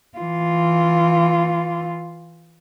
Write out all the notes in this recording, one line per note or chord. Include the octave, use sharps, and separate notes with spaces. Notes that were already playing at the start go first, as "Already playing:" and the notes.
E3 F4